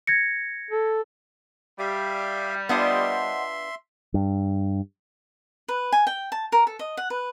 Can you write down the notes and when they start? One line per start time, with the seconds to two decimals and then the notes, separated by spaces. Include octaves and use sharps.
0.07 G#6 A#6 C#7
0.71 A4
1.79 G3 G4 E5 F5
2.69 B3 D4 F4 C5 D#5 E5 F#5 C6
4.14 G2
5.69 B4
5.93 G#5
6.07 G5
6.32 A5
6.52 A#4
6.67 A4
6.79 D#5
6.97 F#5
7.10 B4